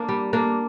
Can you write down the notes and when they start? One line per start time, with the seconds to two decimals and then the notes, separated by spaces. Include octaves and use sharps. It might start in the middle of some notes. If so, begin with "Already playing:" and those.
Already playing: A#3 D4
0.09 G3
0.33 A#3 D4